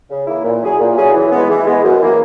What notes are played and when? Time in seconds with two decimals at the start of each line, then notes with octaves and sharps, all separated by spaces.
0.10 C#3
0.27 E3 A#3 E4
0.44 A#2
0.62 F#3 C#4 E4 G#4
0.79 A#2
0.97 F#3 C#4 E4 G#4
1.14 E3
1.31 G#3 B3
1.49 E3
1.67 G#3 B3
1.84 F#2
2.01 E3 A#3